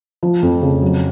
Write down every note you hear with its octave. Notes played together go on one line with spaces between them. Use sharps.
F3
F2
C#3
F#3